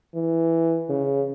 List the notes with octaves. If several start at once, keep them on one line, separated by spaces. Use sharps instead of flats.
E3
C#3